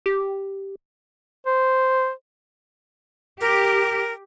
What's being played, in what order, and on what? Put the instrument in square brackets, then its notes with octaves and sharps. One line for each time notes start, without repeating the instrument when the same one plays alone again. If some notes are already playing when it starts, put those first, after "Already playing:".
[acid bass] G4
[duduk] C5
[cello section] G4 [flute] A#4